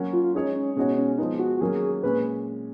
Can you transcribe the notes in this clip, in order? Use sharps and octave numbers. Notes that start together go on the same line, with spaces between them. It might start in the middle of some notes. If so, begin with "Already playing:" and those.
Already playing: F#3 A#3 C#4 F#4
F4
F4
G#3 C#4 D#4 G#4 C#5
C#4
B2 G#3 C#4 D#4 F#4 C#5
C#4
F3 G#3 B3 D#4
F#4
F#4
D#3 F#3 A#3 C#4 G#4
A#2 G#3 C#4 B4